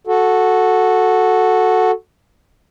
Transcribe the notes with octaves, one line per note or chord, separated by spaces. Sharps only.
F#4 A4